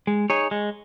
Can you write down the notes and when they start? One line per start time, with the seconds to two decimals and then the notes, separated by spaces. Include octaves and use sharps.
0.07 G#3
0.30 D#4 G#4 C#5
0.51 G#3